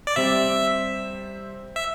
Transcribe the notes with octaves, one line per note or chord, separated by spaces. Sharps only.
D5
C3 G3 C4 E5
E5